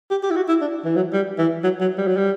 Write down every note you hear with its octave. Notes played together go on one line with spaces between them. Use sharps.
G4
G4
E4
F#4
E4
D4
E3
F#3
G3
E3
F#3
F#3
G3
F#3
G3